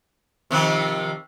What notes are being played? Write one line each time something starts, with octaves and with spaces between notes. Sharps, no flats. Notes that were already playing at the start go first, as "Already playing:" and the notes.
C3 D#3 F3